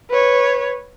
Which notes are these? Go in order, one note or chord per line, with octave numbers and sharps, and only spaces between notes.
B4 C#5